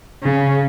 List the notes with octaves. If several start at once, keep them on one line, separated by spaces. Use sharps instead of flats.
C#3